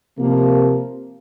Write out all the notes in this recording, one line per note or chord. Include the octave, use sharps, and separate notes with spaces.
C3 F3 A#3